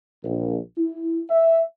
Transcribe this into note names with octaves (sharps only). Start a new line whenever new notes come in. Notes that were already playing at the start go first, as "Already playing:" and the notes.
A#1
E4
E5